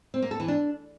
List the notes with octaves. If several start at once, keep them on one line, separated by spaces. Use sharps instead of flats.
C4
A#3
A4
E3
D4